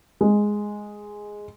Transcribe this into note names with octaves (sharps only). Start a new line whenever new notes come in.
G#3